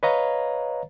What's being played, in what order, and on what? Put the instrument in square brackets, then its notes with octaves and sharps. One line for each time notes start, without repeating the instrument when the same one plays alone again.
[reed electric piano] B4 C#5 D#5 F5 A#5